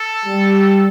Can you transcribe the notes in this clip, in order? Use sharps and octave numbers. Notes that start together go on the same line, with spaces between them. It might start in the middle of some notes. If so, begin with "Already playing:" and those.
Already playing: A4
G3